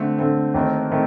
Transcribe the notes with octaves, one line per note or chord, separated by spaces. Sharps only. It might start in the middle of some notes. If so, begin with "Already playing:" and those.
Already playing: D3 A3 C4
D3 A3 C4
D#2 D#3 A3 C4
D#3 A3 C4